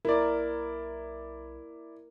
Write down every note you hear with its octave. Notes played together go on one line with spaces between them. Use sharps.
B1 E4 A#4 D5